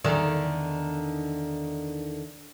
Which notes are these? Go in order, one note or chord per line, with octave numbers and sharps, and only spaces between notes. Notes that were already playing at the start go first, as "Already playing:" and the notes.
E2 D3 D#3